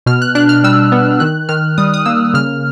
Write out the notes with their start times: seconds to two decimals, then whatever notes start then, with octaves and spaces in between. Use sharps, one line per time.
0.06 B2 F6
0.22 F#6
0.35 D4 F#6
0.49 F6
0.64 G3 E6
0.92 B3
1.20 D#3 F#6
1.49 D#3 F6
1.78 G3 D#6
1.94 D#6
2.06 A#3 E6
2.34 C#3 F6